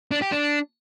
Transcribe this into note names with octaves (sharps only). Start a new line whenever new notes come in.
D4
G4
D4